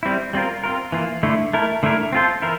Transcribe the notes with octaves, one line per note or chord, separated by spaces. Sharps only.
G3 C4 E4
G3 C4 F4 A#4
C4 F4 A#4
E3 A#3 F4
D3 A3 E4
A3 E4 A#4
D3 A3 E4 A#4
C4 F4 A4 C5
E3 E4 A#4